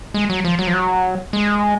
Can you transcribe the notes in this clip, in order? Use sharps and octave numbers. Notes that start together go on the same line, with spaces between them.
G#3
F#3
F3
F#3
F3
F#3
G#3